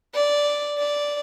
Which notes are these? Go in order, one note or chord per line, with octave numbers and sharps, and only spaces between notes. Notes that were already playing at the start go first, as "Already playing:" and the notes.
D5
D5